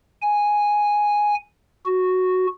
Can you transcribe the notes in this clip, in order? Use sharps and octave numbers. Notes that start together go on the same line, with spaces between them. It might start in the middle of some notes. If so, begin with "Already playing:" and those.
G#5
F#4